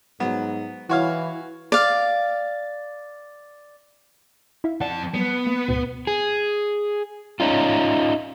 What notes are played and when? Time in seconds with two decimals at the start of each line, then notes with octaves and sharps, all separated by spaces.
0.20 G#2 F#3 B3
0.89 E3 E4 F#4 C#5 F5
1.72 D5 F5
4.64 E4 E5 F5
4.81 F2 D5 F#5 A5
5.14 F#3 G3 B3
5.47 A#3
5.68 D2 G#2 B2
6.07 G#4
7.40 C#4 D#4 F4